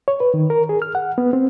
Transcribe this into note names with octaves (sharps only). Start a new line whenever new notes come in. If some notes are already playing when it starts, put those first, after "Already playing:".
C#5
B4
D#3
A#4
G#4
F6
F#5
B3
C4